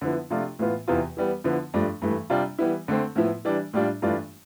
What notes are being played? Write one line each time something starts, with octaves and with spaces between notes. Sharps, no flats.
D3 F3 B3 E4
C3 F3 A3 D4 F4
A2 E3 B3 F4
E2 C3 E3 B3 F4
E3 G3 B3
D3 F3 B3 E4
G2 F3 A3 D4
G2 E3 A3
C3 G3 D4 F4
E3 G3 B3 E4
D3 A3 C4
A2 F3 B3 E4
E3 G3 D4
A2 G3 D4 F4
G2 E3 A3 D4 F4